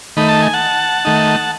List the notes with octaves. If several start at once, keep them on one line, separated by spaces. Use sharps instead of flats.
D#3 A3 D#4 B5
A5
G#5
F#5 A5
D#3 A3 D#4